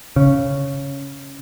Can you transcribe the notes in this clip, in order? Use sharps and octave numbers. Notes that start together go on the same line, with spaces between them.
C#3